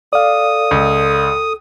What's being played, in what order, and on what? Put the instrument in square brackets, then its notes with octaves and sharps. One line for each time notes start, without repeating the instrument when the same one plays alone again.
[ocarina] A4 [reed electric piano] D5 F5 [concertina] D#6
[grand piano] C#2